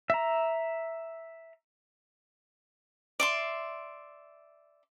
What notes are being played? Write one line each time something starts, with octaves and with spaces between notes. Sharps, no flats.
E5 A#5
D5 E5 C6